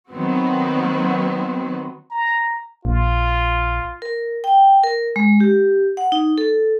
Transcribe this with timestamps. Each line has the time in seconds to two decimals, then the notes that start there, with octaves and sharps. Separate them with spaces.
0.11 D#3 F#3 B3 C4 F#4
2.11 A#5
2.85 A#1 F4
4.02 A#4
4.44 G5
4.83 A#4
5.16 G#3
5.40 G4
5.97 F#5
6.12 D#4
6.38 A4